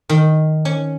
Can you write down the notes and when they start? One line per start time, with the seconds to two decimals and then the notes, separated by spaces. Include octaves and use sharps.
0.09 D#3
0.65 C#4